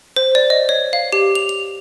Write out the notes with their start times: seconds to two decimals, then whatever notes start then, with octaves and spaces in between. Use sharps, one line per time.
0.16 C5
0.35 D5
0.50 D#5
0.69 C#5
0.93 F5
1.12 G4
1.35 F7
1.49 F7